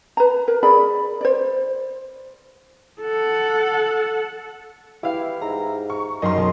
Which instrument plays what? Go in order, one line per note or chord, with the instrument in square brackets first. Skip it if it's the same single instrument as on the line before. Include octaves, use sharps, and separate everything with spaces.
[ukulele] B4 A#5
A#4
G#4 D5 B5
C5 D5
[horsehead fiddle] A4 F#5
[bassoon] E3 [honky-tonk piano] E4 [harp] G4 F5
[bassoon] G#2 [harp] A#5
[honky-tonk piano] C#6
[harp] F#2 C7 [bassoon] D#3 [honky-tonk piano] D#5 C6
[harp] B1